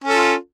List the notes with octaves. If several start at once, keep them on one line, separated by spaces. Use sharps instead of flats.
C#4 F4 A4